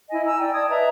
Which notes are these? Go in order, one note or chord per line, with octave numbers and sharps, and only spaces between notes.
E4 D#5 G#5
E4 G#5 A#5 E6
D5 G5
D5 A5 D#6 G#6
B4 D#5 E5 A#5